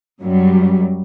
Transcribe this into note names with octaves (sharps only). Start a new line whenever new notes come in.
F#2 F#3 G3